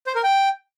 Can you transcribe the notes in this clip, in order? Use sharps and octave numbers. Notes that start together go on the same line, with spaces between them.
C5
A#4
G5